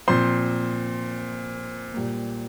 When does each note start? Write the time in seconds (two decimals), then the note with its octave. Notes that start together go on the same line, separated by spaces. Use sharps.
0.08 A#2 F3 C4 C5 C6
1.94 A#2 G3 A#3